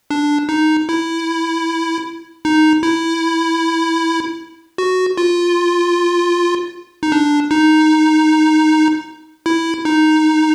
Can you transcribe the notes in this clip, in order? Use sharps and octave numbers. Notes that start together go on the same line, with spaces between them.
D4
D#4
E4
D#4
E4
F#4
F4
D#4
D4
D#4
E4
D#4